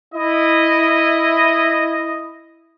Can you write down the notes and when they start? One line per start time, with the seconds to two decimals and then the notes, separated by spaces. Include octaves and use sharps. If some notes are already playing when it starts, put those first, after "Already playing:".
0.14 E4 D#5